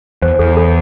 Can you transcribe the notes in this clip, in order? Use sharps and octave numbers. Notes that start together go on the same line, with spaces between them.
E2 C5
E2 A4
A4